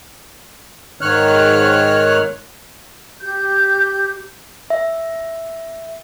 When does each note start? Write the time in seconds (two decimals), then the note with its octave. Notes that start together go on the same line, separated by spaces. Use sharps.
1.01 G#2 D#3 C#5 F6 F#6
3.21 G4 G6
4.70 E5